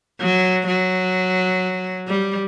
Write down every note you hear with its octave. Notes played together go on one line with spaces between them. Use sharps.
F#3
F#3
G3